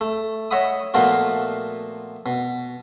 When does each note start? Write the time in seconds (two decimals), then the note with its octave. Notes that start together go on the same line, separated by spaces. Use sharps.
0.01 A3
0.51 C#5 D#5 E5 F#5 B5 D#6
0.94 A#2 F3 A3 B3 F4 F#4
2.26 B2